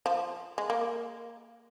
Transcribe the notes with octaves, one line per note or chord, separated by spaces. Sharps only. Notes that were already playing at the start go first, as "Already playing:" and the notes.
F3
G#3
A#3